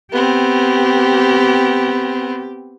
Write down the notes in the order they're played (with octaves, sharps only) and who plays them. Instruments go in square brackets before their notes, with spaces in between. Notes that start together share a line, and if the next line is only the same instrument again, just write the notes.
[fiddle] B3 C4 [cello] G4